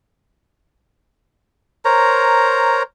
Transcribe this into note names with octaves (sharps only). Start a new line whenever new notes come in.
A#4 C5 C#5 A#5